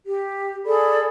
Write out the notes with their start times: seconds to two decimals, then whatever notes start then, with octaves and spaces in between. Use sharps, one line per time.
0.06 G4
0.65 G#4 A4 D5 B5